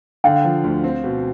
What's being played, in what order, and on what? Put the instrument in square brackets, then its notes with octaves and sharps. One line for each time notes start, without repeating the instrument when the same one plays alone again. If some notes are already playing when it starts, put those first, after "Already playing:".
[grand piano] D3 [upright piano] F5 G5
[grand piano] F3
D2
C4
B2